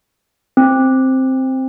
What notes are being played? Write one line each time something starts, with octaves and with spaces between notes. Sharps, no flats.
C4